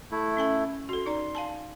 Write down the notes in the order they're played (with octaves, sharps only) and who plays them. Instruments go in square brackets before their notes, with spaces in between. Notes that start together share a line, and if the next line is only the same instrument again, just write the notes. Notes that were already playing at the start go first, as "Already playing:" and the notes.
[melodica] A3 E4
[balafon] C#4 A4 G#5
[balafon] F#4 A4 [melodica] C6
[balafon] D#4 D5 A#5
F5 G#5 A5